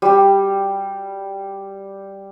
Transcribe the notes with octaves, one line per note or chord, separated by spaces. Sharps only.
G3 G4